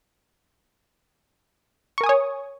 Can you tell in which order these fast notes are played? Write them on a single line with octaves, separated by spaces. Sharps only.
C#6 A#4 G#5 D#6 C#5